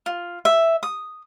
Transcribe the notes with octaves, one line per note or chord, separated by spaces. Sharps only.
F4
E5
D#6